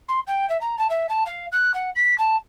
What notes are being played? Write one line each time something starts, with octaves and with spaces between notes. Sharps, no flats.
C6
G5
E5
A#5
A5
E5
A5
F5
F#6
F#5
B6
A5